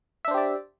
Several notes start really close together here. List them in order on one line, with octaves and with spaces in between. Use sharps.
E5 D4 C5 G4 D5